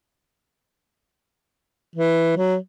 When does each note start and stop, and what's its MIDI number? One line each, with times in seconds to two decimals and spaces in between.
1.96 2.36 52
2.37 2.56 54